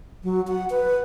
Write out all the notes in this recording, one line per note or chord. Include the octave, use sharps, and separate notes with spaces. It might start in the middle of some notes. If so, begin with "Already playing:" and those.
F#3
F#5
B4